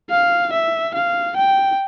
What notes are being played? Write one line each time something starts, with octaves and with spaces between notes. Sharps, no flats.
F5
E5
F5
G5